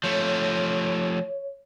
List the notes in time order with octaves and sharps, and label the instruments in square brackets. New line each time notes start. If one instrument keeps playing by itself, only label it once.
[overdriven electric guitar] F3 A3 [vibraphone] C#5